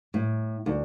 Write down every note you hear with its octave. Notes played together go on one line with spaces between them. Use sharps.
A2
D2